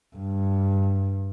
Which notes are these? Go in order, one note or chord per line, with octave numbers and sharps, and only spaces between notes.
G2